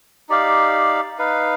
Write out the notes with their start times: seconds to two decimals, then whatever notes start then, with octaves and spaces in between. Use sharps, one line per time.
0.29 D#4 G4 D5 F5
1.18 D#4 B4 F5